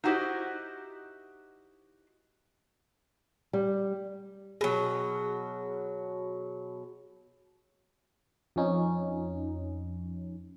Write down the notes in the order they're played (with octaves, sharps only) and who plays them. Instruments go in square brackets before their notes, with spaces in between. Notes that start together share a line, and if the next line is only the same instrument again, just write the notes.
[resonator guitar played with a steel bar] D#4 E4 F#4 G4 C5 D#5
[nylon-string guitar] G3
[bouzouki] B2 F#3 [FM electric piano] G#4
[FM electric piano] F2 F3 C#4 D#4